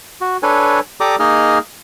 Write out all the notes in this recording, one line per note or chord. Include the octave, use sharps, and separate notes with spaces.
F#4
D4 A4 B4 C#5 G#5
G4 A4 D5 A#5 D6 D#6
A#3 D#4 G#4 D#5 D#6 F6